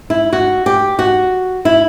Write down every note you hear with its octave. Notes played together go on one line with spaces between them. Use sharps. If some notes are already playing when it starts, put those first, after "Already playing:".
E4
F#4
G4
F#4
E4